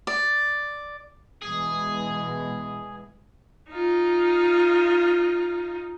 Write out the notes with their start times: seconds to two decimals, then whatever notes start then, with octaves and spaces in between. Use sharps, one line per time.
0.07 D5
1.42 B2 E3 G#3 G#4
3.71 D#4 F4